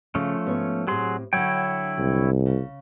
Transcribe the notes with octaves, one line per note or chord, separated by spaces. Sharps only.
C#3 F3 A3 C#4
G#2 B3 C#5
A2 F#3 C4 G4 G#4 C6
D3 F#3 E4 C#5 G5
C2
C#3